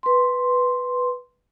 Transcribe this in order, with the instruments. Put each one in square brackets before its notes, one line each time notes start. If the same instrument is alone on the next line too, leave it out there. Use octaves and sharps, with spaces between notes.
[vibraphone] B4 C6